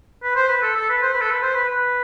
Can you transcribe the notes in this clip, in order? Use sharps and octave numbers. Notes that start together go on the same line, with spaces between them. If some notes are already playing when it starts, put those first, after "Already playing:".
B4
C5
B4
A4
A4
B4
C5
B4
A4
B4
C5
B4
B4